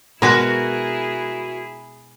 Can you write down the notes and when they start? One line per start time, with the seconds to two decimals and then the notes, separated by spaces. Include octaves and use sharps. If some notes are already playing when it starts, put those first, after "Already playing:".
0.22 B2 G#3 E4 F#4 G#4 A#4 B4